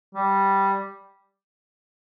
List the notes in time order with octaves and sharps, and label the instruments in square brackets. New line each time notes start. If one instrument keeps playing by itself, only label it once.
[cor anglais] G3